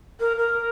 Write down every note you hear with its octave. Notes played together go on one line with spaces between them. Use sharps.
A#4
A#4